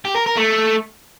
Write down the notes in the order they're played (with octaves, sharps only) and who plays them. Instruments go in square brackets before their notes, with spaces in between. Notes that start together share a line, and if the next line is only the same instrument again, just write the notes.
[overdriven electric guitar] G4
A#4
A#4
A3